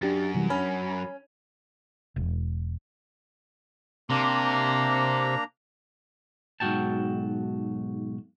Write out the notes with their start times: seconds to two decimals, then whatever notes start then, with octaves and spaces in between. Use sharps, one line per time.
0.02 F#2 D4 G4 A6
0.35 C3 E3 G3
0.50 C#4 B5
2.16 E1
4.10 C3 A#3 D4 A#5
6.60 B1 G#2 C#3 F#4 G5 A5